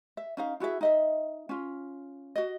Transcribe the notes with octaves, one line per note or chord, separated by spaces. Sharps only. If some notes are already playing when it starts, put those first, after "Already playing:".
E5
C#4 D#4 F5
E4 F#4 G#4 E5
D#4 D#5 E5
C#4 F4
F#4 D#5